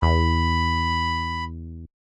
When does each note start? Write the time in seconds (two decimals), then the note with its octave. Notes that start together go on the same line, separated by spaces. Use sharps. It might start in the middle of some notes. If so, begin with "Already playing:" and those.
0.02 E2 B5